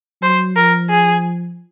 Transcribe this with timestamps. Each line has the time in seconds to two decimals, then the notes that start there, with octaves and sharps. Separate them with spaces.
0.22 F#3 C5
0.56 F3 A#4
0.90 G#4